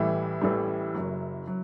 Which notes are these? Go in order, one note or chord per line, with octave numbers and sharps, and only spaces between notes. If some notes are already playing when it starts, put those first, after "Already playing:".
Already playing: A1 A2 E3 G3 E4
A1 A2 E3 G3
F#1 F#2 F#3
F#3